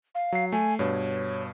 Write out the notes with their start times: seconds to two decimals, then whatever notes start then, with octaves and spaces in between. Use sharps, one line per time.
0.15 F5
0.32 F#3 C7
0.52 A3 G#5
0.79 G2 B2 C#5